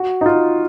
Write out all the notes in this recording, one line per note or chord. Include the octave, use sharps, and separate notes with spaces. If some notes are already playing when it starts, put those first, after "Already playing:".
Already playing: F#4
D#4
F4